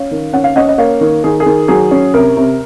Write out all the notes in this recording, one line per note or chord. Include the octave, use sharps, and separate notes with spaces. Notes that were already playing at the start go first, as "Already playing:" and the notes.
Already playing: C#4 C#5 F5
D#3
C#4 F#5
F5
C#4 D#5 F#5
D#5
A#3 C#5 F5
D#3
D#3 G#4
G#4
D#3
F#3 G#4
C#4
C3 A#4
C3